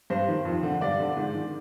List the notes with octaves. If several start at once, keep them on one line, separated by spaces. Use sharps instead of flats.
G2 C5
D#3
F2
D3
G2 D5
D3
G#2
D#3